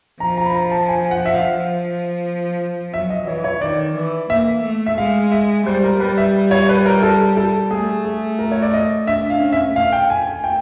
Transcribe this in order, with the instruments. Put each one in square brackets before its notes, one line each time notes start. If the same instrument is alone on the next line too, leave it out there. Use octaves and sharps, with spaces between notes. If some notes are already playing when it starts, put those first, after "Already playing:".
[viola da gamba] F3 [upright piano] A#5
[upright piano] A#5
B5
A#5
A5
G#5
F#5
E5
F5
[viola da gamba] F3
[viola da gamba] F#3 [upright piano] E5
[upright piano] D#5
[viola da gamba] E3 [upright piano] C#5
[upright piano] C#5
[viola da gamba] D#3 [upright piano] D5
[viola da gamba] E3
[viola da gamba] A#3 [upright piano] E5
[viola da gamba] A3
[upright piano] E5
[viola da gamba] G#3 [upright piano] F5
[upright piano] E5
[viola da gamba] G3 [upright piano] C5
[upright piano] A#4
[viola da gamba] G3 [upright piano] B4
[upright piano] E5
C#5
B4
A#4
A4
A4
[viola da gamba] A3 [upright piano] G#4
[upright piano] G#4
A#4
C#5
D5
D#5
[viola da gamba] D4 [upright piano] E5
[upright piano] F5
[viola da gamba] C#4
[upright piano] E5
[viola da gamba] A3 [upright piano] F5
[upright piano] G5
G#5
G#5
G5